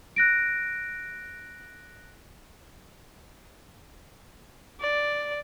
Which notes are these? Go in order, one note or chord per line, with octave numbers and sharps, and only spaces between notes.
F#6 A#6 D7
D5